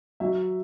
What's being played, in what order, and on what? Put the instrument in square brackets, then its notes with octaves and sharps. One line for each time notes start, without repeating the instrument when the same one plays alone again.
[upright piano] F#3 E5